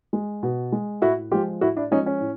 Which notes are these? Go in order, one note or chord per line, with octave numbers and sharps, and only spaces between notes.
G#3
B2
G#3
A2 E4 F#4
F3 G#3 F4 G4
A2 E4 F#4
D4 E4
F3 G#3 C#4 D#4
C#4
A2